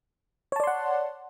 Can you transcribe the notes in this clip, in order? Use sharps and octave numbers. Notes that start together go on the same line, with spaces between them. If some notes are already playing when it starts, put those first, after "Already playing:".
C#5 D5 F#5 A5 C6